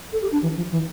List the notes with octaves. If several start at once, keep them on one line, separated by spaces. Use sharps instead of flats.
A4
G4
D4
E3
F3
E3